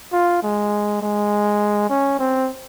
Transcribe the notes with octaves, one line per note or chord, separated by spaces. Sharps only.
F4
G#3
G#3
C#4
C4